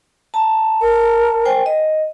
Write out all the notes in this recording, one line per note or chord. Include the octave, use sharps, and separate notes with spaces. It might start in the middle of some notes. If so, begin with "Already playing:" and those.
A5 A#5
A#4
C5 G5 G#5
D#5